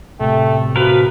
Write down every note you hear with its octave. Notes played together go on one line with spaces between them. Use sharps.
A2 C3 A3 G5
F3 F#4 A#4 B4